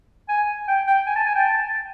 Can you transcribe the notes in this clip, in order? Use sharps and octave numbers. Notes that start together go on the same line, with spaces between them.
G#5
G5
G5
G#5
A5
G#5
G5
A5